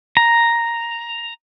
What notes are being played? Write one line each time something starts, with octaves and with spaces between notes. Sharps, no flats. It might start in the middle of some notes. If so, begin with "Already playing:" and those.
A#5